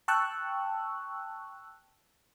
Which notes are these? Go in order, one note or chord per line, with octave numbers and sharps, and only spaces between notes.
G5 A5 C#6 E6 F#6